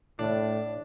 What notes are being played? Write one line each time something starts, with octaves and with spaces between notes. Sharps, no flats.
A2 D4